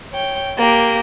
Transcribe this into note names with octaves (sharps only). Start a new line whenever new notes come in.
C#5 G5
A#3 G4